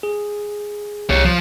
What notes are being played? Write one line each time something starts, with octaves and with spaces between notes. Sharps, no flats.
G#4
C2 G4 C#5
F3